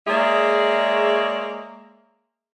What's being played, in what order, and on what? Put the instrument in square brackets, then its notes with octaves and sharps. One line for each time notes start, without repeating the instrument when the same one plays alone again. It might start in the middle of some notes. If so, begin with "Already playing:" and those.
[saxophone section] G#3 A#3 G#4 C#5 D5 E5